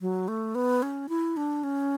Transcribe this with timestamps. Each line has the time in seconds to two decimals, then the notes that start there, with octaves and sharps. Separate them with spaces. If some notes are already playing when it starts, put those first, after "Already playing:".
0.01 F#3
0.28 A3
0.55 B3
0.82 C#4
1.09 E4
1.37 D4
1.64 C#4